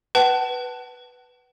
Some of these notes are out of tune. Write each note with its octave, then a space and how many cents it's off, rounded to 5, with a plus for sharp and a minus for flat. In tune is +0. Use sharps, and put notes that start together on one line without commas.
B4 +0 F#5 +35 A5 +0